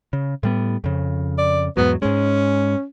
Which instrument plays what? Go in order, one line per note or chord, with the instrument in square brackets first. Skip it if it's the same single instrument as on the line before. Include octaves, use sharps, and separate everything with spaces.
[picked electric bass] C#3
A2 G3 B3
F2 C#3
[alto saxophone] D5
[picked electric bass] E2 G#2 F#3 [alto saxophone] B3
[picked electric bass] G#2 G#3 [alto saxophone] C#4